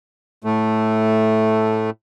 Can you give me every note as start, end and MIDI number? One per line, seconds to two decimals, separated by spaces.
0.44 1.90 45
0.44 1.90 57